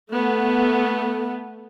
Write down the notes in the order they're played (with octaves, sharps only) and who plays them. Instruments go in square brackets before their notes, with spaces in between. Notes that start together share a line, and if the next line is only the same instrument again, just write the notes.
[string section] A3 B3